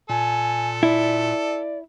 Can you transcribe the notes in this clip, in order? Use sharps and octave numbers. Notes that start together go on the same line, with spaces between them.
A#2 A4 G#5
E4 D5